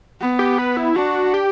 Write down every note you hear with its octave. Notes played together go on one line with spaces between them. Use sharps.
B3
G4
B4
E4
D4 F#4
G4